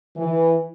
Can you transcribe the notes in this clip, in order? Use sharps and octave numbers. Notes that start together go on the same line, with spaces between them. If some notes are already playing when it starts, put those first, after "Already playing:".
E3